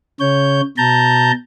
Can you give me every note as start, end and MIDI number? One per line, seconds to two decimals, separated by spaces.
0.20 0.61 49
0.20 0.61 73
0.20 0.61 91
0.78 1.32 47
0.78 1.32 81
0.78 1.32 82
0.78 1.32 91